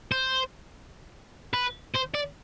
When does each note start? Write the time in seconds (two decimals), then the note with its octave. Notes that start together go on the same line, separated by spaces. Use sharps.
0.12 C5
1.54 B4
1.94 C5
2.14 D5